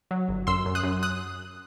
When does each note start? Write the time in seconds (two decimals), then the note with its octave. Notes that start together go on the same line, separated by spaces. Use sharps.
0.11 F#3
0.29 G1
0.47 F#2 C6 E6
0.66 F#2
0.75 D#6 F#6
0.83 F#2
1.03 D#6 F#6